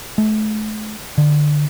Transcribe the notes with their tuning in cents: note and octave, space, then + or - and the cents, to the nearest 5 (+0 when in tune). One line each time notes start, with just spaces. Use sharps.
A3 -40
D3 +15